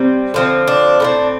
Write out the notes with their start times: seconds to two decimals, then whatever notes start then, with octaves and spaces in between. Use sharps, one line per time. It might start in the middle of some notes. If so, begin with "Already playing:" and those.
Already playing: C3 G3 C4
0.34 D3 F3 C4
0.68 D4
1.00 A2 A3 C4